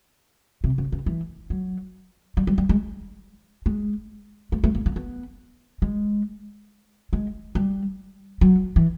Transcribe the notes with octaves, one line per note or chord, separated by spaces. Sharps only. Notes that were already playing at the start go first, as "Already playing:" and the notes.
C3
C#3
C#3
E3
F#3
G3
G3
G3
G#3
G#3
A3
A3
A#3
A#3
B3
G#3
G#3
G3
F#3
E3